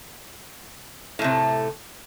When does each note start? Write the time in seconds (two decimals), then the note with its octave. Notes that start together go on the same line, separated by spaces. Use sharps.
1.19 A2
1.22 A3
1.24 C3